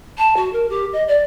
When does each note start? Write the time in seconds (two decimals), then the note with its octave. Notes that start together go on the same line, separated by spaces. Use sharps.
0.18 A5
0.36 F#4
0.53 A#4
0.69 G4
0.93 D#5
1.08 D5